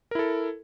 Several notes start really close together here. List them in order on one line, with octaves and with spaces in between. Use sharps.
A#4 E4 A4